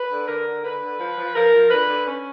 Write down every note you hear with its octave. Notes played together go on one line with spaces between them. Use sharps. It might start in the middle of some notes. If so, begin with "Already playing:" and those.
Already playing: B4
D3
D3 A#4
D3
D3 B4
D3
F3
F3
F3 A#4
F3
D3 B4
D3
C#4